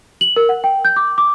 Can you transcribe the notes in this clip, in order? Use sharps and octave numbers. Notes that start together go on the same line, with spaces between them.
F#7
A#4
F#5
G5
G6
D6
D6